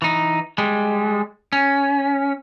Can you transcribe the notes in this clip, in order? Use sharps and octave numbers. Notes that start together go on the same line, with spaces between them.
E3 D#4
G3 G#3
C#4